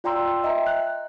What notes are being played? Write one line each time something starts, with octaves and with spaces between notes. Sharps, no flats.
F4 D5 G5 A#5 C6 E6
D#5 E5 G5 A#5
F#6